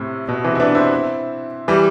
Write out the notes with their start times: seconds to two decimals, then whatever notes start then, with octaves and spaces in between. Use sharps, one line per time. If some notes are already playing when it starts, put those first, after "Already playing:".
Already playing: A2 C3
0.28 B2
0.44 C3 E3
0.55 E4
0.60 B3 D4
0.75 C4 E4
1.68 E3 G3